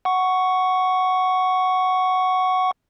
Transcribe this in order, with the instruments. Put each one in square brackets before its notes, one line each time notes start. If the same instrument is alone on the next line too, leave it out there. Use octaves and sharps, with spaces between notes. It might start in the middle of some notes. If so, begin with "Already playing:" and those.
[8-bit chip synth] F#5 C#6